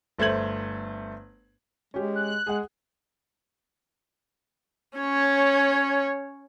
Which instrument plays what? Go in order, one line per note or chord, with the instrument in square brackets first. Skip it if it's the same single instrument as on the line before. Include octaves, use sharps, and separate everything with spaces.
[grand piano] G1 A3 C5 G#6 F#7
[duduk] G#3 [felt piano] C#4 G4
[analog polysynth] F#6
[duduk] G#3 [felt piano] G#4 F#5
[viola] C#4 C#5